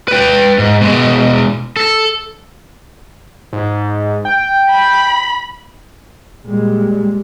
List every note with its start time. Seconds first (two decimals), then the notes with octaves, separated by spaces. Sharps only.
0.08 B4 G5
0.58 G#2
0.81 B2 G#3
1.76 A4
3.53 G#2
4.25 G5
4.70 B5
6.47 A#2 G3 G#3